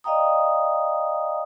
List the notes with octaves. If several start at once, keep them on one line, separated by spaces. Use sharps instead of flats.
D5 D#5 F5 G5 A#5 D#6